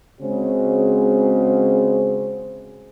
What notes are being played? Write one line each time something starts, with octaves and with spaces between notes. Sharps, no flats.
C#3 G#3 C4 F#4 C5 C#5